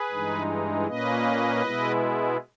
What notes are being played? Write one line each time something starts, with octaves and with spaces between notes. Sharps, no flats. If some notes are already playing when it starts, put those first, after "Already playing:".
Already playing: G#4 B4
G2 E3 G#3 D#4
A#2 A#3 C#4 B4 D#5
B2 G#3 B3 E4